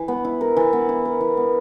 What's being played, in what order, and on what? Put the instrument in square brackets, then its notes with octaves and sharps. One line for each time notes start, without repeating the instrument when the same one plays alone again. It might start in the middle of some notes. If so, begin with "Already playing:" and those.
Already playing: [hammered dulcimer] E3
B3
E4
A#4
E3
B3
E4
A#4
E3
B3